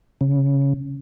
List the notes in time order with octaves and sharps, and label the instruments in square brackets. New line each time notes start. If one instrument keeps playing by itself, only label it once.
[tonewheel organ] C#3